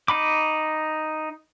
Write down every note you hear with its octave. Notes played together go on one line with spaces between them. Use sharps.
D#4 B5 D6